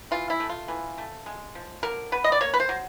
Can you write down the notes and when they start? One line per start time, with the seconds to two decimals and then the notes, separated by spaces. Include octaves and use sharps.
0.11 E3 F4
0.30 E4
0.40 A3
0.49 F4
0.68 E3
0.98 A3
1.26 G#3
1.55 F3
1.83 D3 A#4
2.12 B3 B4
2.24 D#5
2.32 D5
2.41 A#3 C#5
2.54 B4
2.60 C5
2.69 F#3